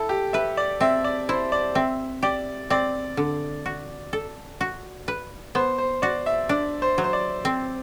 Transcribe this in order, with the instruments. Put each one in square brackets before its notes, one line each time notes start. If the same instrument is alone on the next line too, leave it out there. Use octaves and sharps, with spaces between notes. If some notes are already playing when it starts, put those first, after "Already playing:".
Already playing: [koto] E4 [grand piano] A4
[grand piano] G4
[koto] B4 [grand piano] E5
[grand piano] D5
[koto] C4 [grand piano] E5
[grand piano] D5
[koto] E4 [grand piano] C5
[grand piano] D5
[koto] C4 [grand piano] E5
[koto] G4 [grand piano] D5
[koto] C4 [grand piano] D5
[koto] D3
F#4
A4
F#4
B4
[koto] B3 [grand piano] C5
[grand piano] C5
[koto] F#4 [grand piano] D5
[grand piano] E5
[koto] D4 [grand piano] D5
[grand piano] C5
[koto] F#3
[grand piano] C5
D5
[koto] C4